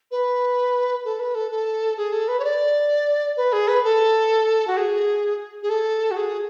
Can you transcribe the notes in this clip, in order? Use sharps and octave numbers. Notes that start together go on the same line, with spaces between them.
B4
A4
B4
A4
A4
G#4
A4
B4
C#5
D5
B4
G#4
B4
A4
F#4
G#4
G#4
A4
F#4
G#4